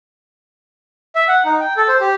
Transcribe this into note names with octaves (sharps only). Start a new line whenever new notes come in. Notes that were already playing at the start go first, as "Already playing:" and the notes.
E5
F#5
D#4
G5
A4
C5
G4